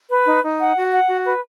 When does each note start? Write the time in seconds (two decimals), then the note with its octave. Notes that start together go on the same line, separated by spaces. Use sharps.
0.10 B4
0.26 D#4
0.43 D#4
0.59 F#5
0.76 F#4
0.92 F#5
1.09 F#4
1.26 B4